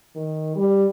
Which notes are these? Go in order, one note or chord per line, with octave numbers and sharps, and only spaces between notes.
D#3
G3